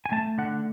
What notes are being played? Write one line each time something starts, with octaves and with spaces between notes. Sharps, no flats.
G#5
A3 A5
D3 F#5